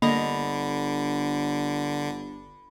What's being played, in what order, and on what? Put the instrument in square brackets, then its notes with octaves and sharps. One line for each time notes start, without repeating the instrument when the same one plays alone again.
[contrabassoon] G1 [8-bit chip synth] D3 [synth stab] A#3 D#5 A#6 [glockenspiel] B5